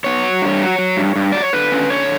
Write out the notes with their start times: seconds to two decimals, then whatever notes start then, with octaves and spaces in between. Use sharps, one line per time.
0.04 B3 C#5
0.23 F#3
0.42 G2
0.61 F#3
0.79 F#3
0.97 G2
1.16 G2
1.32 F#3 D5
1.42 C#5
1.53 D3 B4
1.72 C#4
1.90 D3 C#5